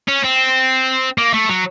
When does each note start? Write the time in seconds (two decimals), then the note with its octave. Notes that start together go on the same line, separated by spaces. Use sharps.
0.08 C#4
0.24 C4
1.18 A#3
1.34 A3
1.49 F#3